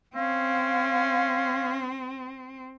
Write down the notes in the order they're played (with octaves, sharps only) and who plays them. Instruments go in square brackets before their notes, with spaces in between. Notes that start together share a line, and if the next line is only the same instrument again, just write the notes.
[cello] C4 [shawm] C#4 [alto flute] F5